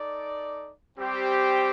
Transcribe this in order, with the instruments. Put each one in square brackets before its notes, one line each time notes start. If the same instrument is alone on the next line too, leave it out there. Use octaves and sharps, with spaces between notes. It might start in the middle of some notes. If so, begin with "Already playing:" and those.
Already playing: [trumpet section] D#4 A4 D5
G3 C4 G4 C5 G5